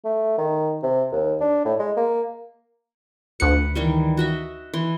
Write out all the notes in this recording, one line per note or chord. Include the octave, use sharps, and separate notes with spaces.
A3
D#3
C3
D#2
D4
A2
G#3
A#3
D2 B4 F#5 C#7
D#3 E3 G3
F#4 D#5 E5
E3 C6